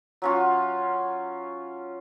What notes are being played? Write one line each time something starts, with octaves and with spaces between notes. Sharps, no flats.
F#3 C#4 F4